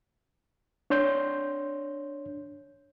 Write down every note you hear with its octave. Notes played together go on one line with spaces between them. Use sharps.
D4 C#5 C6 G6